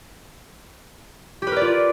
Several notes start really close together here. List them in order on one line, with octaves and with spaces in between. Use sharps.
G4 B4 A#4 D5 F4